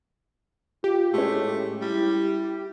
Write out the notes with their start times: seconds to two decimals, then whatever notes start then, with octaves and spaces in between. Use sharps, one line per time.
0.84 F4 G4
1.14 A2 G#3 A3 C#4
1.82 G3 E4